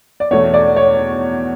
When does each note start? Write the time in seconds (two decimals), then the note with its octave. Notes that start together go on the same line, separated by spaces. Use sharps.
0.20 D5
0.31 E2 B2 A3 C#5
0.54 D5
0.76 C#5